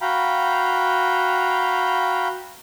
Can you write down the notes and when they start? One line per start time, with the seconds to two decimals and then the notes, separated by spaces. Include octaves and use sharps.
0.01 F#4 F5 G5 A#5 B5